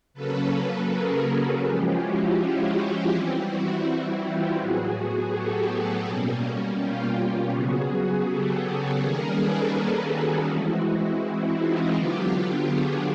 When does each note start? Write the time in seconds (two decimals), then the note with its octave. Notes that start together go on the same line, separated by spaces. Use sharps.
0.14 C#3 F#3 A#3 C#4 A4 B4
0.88 G#4 A#4
1.25 F#4 G#4
1.62 F3 G#3 C#4 F4 G4
1.99 E4 F#4
3.09 E3 G3 C4
3.46 E4 F#4
4.20 F4 G4
4.57 A2 F#3 B3 F#4 G#4
5.31 G4 A4
5.68 F#4 G#4
6.05 B2 G3 A#3 C#4
6.79 F4 G4
7.52 C#3 F#3 B3 F#4 G#4
8.26 G4 A4
9.00 D#3 G3 A#3 C#4 G#4 A#4
9.37 A4 B4
9.74 G#4 A#4
10.11 F#4 G#4
10.48 E3 G#3 C4 E4 F#4
11.22 E4
11.59 D#4 F4
11.95 D3 F#3 B3 D4 F4 G4
12.33 F4 G4
12.69 F#4 G#4